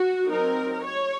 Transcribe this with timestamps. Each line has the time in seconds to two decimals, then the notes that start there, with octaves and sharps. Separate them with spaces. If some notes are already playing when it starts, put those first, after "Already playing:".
Already playing: F#4
0.29 F#3 C4 D#4 A#4
0.85 C#5